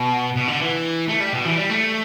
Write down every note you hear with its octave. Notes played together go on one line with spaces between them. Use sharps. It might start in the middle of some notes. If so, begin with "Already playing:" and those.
Already playing: B2
B2
D3
E3
A3
G3
B2
E3
G3
A3